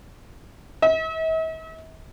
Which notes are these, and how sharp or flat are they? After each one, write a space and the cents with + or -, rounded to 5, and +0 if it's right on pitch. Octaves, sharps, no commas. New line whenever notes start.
E5 -45